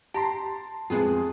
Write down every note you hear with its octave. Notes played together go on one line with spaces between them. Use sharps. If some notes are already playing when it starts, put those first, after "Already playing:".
G4 A5 A#5 C6
F2 G#3 B3 F4 G#4